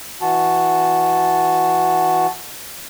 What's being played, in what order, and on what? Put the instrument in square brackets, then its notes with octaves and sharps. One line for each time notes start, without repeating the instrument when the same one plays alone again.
[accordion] E3 F#4 A5